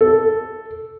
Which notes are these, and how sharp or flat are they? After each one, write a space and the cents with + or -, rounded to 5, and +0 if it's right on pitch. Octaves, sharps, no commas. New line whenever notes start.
A4 -5